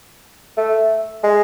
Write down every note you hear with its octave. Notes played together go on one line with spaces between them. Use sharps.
A3
G#3